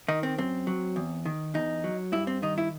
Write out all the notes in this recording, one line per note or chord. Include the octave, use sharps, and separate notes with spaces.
D#3 D#4
C4
F#2 C4
F#3
E2
D#3
E2 D#4
F#3
G2 E4
C4
D#3 D#4
E4